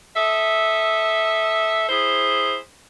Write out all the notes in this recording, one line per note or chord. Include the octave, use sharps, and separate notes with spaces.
A4 D#5 E5
E4 G#4 C5